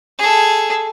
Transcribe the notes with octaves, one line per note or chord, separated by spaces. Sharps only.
G#4 A4